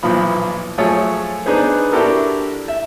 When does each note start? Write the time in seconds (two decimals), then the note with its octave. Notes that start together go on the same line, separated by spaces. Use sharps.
0.03 B1 A#2 E3 F3 B5
0.78 F3 F#3 A3 G#4 C#5 G#5
1.46 B3 D4 D#4 G#4 B4 C5
1.92 D4 E4 F#4 G4 A4 A#4
2.68 E5